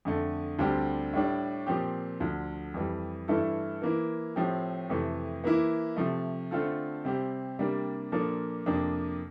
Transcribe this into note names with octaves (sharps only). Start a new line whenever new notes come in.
F2 D3 A3
D2 D3 G3 C4 G4
A2 G3 D4
A#2 F3 C4 G4
D2 D3 F3
F2 E3 G3
G2 E3 A3 E4 A4
E3 A#3 E4
A2 F3 C4 G4
F2 C3 E3 A3
E3 A#3 E4
C3 F3 A3
D3 A3 C4 F4 A4
C3 G3 C4 G4
C3 G3 A#3 D4
A#2 F3 A#3 D4 A4
F2 C3 F3 A#3 D4